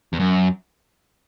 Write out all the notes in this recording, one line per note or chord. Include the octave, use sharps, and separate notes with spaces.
E2
F#2